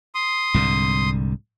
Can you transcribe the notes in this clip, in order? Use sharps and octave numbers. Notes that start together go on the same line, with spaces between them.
C6 D#6
C2 G#2 D3